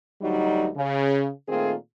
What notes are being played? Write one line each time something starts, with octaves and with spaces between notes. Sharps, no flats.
D2 F#3 G3 D#4
C#3
A#2 D#3 A3 C4 F4 G#4